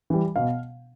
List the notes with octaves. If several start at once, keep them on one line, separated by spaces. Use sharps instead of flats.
E3 G3
B2 F5